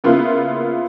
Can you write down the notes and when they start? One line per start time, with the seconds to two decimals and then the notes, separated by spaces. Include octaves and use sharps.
0.04 C#3 A#3 B3 E4 F4